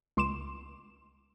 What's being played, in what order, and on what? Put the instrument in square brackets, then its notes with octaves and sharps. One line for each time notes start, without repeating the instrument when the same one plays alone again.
[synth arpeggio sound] C#2 C6 D6 E7